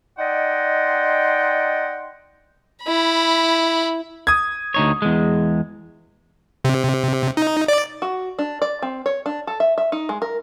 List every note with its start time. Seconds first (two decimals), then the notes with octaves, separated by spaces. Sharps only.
0.19 D#4 D5 D#5 F#5 G5 C6
2.84 E4 B5
4.27 D#6 G#6
4.74 D2 D#4 C#5
5.02 E2 G#3
6.65 C3
7.37 D#4
7.68 D5
8.02 F#4
8.39 D4
8.62 D5
8.82 C4
9.06 C#5
9.26 D4
9.47 A4
9.60 E5
9.78 E5
9.92 D#4
10.09 G#3
10.22 A#4